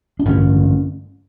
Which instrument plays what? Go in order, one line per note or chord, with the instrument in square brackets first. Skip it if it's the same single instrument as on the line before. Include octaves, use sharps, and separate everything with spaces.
[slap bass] D4
A1 G2 D3 C#4